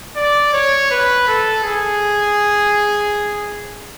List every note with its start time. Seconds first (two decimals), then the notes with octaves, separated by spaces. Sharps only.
0.16 D5
0.53 C#5
0.91 B4
1.27 A4
1.63 G#4